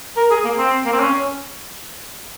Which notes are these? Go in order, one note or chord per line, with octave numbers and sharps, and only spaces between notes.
A#4
G#4
A#3
C4
A#3
C4
C#4